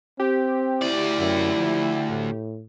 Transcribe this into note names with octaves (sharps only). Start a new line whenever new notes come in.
C4 G4
D2 E4 D5
F#2
F3
A2